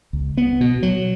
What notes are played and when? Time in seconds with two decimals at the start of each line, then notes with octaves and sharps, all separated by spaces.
0.13 C#2
0.37 B3
0.61 B2
0.83 F#3